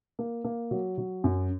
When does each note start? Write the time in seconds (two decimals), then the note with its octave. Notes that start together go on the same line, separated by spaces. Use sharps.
0.19 A#3
0.45 A#3
0.71 F#3
0.98 F#3
1.24 F#2